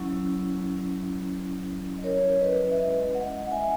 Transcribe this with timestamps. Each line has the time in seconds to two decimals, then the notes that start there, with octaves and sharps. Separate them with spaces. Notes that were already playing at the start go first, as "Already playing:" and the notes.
Already playing: F#3 C#4 E4
1.98 D#5
2.04 A#4 C#5
2.41 B4 D#5
2.71 E5
2.77 G#3 C#4 E4 B4 D#5
3.15 D#5 F#5
3.41 F#5
3.51 E5 G#5